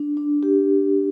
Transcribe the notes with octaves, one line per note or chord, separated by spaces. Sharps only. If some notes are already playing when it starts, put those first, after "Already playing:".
Already playing: D4
D4
G4